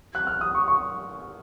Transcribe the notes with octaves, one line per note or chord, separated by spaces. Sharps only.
F#6
F6
D#6
C#6
C#6